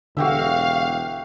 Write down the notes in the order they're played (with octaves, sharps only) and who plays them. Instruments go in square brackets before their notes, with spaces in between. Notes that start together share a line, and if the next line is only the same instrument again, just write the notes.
[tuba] E1 [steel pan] D3 [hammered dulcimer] F#4 G4 E5 [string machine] F5